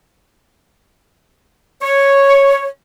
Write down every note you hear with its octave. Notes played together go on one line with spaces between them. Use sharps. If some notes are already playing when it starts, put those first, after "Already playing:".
C#5